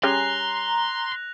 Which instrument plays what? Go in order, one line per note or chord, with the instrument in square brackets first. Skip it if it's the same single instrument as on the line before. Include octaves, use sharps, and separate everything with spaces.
[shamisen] G3 C#4 G#4 [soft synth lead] A#5 [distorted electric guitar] C6 [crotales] F#6 A#6 F7